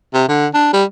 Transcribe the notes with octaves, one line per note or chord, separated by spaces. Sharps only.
C3
D3
D4
G3